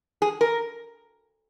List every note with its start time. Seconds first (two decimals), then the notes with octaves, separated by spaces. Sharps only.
0.22 G#4
0.41 A#4